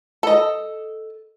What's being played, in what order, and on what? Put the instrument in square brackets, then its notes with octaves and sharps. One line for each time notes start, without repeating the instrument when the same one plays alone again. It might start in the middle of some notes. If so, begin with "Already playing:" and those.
[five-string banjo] A4 D#5